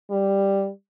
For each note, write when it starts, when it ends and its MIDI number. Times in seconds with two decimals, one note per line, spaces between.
0.11 0.69 55